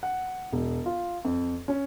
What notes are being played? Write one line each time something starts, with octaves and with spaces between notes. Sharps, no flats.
F#5
E1
F4
F2
C#4